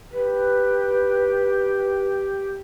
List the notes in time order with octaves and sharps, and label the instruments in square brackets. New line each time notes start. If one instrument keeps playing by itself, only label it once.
[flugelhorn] G4 [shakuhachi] B4